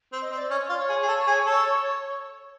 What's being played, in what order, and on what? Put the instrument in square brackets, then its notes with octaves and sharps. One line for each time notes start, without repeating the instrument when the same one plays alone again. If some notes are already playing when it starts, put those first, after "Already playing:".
[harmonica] C4
[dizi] D#5
[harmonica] C4
[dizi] D5
[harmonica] C#4 [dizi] C#5
[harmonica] F4
[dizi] D5
C#5
[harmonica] G#4
G#4
A4
G#4
A4